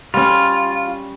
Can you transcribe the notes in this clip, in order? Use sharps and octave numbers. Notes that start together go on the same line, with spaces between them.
G3 C#4 F4